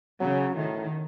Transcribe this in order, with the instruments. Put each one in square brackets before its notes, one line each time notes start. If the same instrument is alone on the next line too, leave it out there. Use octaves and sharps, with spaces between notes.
[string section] C#3 [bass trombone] F#3
[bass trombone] A2 [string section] D#3